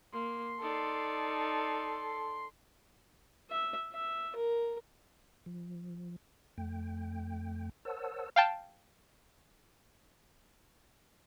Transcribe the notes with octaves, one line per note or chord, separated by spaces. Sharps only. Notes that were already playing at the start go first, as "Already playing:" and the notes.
A#3 C6
D#4 A4 D5
E5
E5
A#4
F3
F2 A3 G5
A#4 C5 C#5 F#5 A5 E6
F5 G5 A5